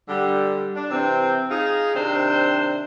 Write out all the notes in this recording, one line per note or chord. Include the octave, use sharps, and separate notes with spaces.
D3 G3
D4
C3 E3 C4
D#4 F4 G#4
C3 D#3 D4 C5